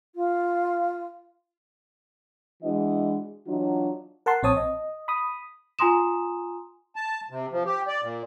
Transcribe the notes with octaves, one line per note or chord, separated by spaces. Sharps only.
F4
E3 G#3 D4 E4 F#4 D#5
E3 F#3 D4 D#4 F4 F#4
A#4 F#5 A5 C6
A#1 C4 C#5 A5 D#6
D#5
B5 D#6
F4 G#5 A#5 C6 D#6 E7
A5
C3
F3
G4
D5
A#2